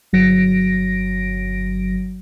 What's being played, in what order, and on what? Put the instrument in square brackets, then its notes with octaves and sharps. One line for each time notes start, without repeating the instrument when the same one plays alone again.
[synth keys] G1 F#3 A#6 D7